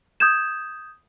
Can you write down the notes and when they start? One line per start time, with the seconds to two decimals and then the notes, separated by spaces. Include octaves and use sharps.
0.20 D#6 G6 G#6 E7